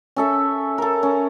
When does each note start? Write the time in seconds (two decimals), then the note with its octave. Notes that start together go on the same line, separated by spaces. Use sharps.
0.16 C#4 A4 E5
0.78 A4 A#4
1.03 C#4